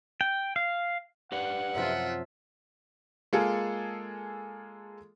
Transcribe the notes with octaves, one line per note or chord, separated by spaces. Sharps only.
G5
F5
G4 B4 D5 F#5
F#2 C3 F3 F4 E5
G#3 A#3 F4 G#4 A4